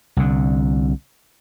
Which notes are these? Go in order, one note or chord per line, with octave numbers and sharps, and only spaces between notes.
C2 D3